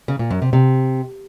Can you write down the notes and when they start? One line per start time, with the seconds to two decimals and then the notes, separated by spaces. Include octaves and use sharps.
0.08 C#3
0.19 A#2
0.31 F#2
0.42 C3
0.53 C3